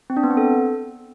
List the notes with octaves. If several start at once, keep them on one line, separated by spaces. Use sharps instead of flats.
C4
D4
B3
C4
A4